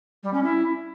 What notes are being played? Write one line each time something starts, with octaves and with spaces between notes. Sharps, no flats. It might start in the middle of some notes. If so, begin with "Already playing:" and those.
G3
C#4
E4